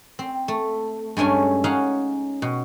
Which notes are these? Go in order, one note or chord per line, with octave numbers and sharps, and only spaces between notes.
C4
A3
G2 G#3 A3 C#4 G#5
C#4 D#4 G#4 F5 F#5
B2